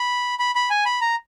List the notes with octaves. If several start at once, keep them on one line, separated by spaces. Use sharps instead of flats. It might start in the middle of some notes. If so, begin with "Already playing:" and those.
Already playing: B5
B5
B5
G#5
B5
A#5